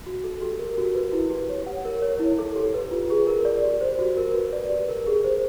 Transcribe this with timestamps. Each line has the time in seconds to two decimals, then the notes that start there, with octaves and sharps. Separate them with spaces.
0.06 F#4
0.24 A4
0.42 G4
0.59 A#4
0.78 F#4
0.95 B4
1.13 E4
1.30 G4
1.49 C#5
1.67 F#5
1.85 A#4
2.02 C#5
2.20 E4
2.39 A4
2.56 G4
2.74 B4
2.91 F4
3.10 G#4
3.27 A#4
3.45 D5
3.63 G4
3.81 C5
3.99 F#4
4.17 A#4
4.35 B4
4.53 D5
4.70 G4
4.88 A#4
5.06 G#4
5.24 C5